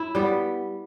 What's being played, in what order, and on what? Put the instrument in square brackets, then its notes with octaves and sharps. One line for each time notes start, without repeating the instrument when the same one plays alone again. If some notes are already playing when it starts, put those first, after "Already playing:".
Already playing: [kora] E4
G3 B3